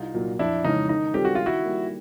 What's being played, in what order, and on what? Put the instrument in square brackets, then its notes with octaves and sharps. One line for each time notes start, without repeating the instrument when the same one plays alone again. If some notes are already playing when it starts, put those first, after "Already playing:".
Already playing: [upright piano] C2 [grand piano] D#4 F4
[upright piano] A#2 F#3
[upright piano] F2 [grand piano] D4 E4
[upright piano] C#3 E3 G#3 C#4 [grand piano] D#4
[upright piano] D#3 [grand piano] D#4
[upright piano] G3 C4 F4 A4 [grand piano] G4
[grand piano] F#4
[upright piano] D#3 [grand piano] F4
[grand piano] E4 F#4
[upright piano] G3 A#3